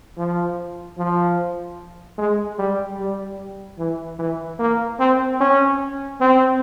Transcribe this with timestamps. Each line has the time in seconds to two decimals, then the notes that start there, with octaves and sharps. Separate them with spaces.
0.17 F3
0.98 F3
2.18 G#3
2.58 G3
2.99 G3
3.79 E3
4.19 E3
4.59 A#3
4.99 C4
5.40 C#4
6.20 C4